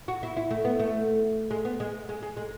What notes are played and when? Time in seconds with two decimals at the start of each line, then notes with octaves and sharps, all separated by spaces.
0.08 F#4
0.23 E4
0.36 E4
0.51 A3
0.65 B3
0.80 A3
1.51 G#3
1.65 B3
1.80 G#3
2.09 G#3
2.22 G#3
2.37 G#3